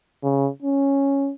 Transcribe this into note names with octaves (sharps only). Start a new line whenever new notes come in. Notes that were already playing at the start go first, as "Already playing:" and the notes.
C#3
C#4